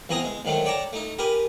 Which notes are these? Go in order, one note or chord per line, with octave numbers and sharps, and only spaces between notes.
E2 E3 C4 G#5 A#5 D#6
G#3
G#2 D#3 F#3 A3
C#5 D5 G5 A5 A#5
A3 D#4
G4 A#4 B4 G#5